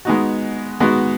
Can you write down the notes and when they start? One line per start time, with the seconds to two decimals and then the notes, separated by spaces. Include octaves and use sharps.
0.05 G#3 B3 D#4 F#4
0.80 G#3 B3 D#4 F#4